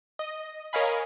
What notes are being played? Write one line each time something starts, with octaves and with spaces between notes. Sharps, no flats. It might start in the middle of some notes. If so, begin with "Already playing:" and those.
D#5
A#4 C#5 D#5 F5 G#5 B5